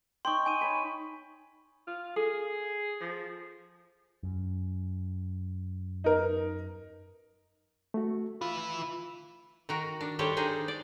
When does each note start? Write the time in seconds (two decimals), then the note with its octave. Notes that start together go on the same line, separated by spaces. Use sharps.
0.25 D#4 G5 C6 C#6
0.46 D#4 G#5 D#7
0.61 C#5 B5
1.87 F4
2.16 G#4 A4
3.01 F3
4.23 F#2
6.04 D#4 A#4
7.94 A3 F#4
8.41 E4 F4 B4
9.69 D#3 F#4 A#4
10.01 D4
10.19 D#3 G3 G4 A4 C5 C#5
10.37 D4 D#4 G#4 C5
10.68 D5